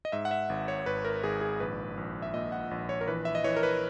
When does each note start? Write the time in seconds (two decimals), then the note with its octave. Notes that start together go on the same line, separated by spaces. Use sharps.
0.05 D#5
0.12 G#2 E5
0.25 F#5
0.31 E5
0.50 G#1
0.68 C#5
0.86 G#1 B4
1.05 A#4
1.23 G#1 G#4
1.41 G#4
1.60 A#1 B4
1.97 A#1
2.22 E5
2.34 A#2 D#5
2.52 F#5
2.71 A#1
2.89 C#5
3.01 A#4
3.07 E3 B4
3.25 E5
3.35 D#5
3.44 E3 C#5
3.56 A#4
3.63 B4